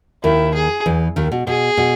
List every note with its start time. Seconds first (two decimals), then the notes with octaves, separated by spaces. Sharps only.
0.24 D#2 D#3 E4
0.54 G#4
0.86 E2 E3
1.16 D#2 D#3
1.32 B2
1.47 B2 G#4
1.77 B2